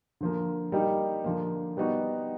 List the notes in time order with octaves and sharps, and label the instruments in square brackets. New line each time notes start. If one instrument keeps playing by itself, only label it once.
[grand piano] D3 F3 A#3
G3 A#3 D#4 G4
D3 F3 A#3
G3 B3 D#4 F#4